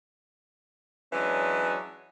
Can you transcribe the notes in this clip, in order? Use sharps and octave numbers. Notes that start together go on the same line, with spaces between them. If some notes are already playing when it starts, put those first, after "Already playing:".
E3 F#3 G#3 C#4 D4